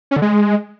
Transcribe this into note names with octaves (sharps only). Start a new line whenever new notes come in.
C#4
D3
G#3